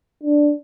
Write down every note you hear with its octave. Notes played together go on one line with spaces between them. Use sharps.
D4